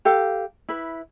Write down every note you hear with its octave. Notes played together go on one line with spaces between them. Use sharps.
G4 A4 B4 F5
E4 B4